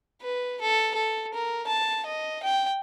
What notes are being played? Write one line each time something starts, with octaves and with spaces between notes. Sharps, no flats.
B4
A4
A4
A#4
A5
D#5
G5